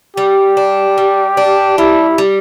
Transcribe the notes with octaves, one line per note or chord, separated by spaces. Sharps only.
G3 G4
D4
G3
D4
G3 E4
G3